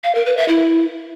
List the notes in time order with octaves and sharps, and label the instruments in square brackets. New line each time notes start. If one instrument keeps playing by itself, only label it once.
[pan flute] F5
A#4
B4
E5
E4